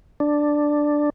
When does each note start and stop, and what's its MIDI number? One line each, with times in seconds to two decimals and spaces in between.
0.20 1.10 62